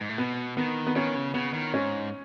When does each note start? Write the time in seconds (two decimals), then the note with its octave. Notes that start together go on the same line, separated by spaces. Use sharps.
0.01 G#2
0.09 A2
0.18 B2 B3
0.57 D#3 B3
0.87 B3
0.96 D#3 C#4
1.15 C#3
1.34 C#3 B3
1.54 D#3
1.73 G#2 C#4